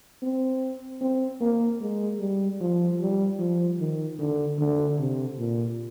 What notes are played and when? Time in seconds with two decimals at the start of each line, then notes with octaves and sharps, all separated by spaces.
0.22 C4
1.01 C4
1.41 A#3
1.80 G#3
2.20 G3
2.60 F3
3.00 G3
3.39 F3
3.79 D#3
4.19 D3
4.59 D3
4.98 C3
5.38 A#2